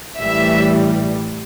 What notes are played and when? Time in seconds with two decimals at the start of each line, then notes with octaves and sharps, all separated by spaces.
0.19 A1 A2 E3 G3 E5